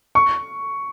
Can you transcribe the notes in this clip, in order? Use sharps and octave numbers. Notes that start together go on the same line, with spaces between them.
C#6